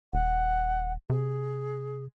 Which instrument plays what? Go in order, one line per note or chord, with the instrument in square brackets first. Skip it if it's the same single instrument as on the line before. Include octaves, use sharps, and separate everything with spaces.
[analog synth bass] D#1 [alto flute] F#5
[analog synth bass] C3 [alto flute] G#4